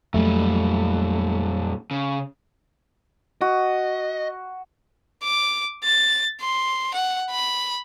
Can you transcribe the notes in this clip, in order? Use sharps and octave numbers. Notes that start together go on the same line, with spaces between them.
F2 A#2 F#3 G3 A3
C#3
F#4 D#5
D6
A6
C6
F#5
B5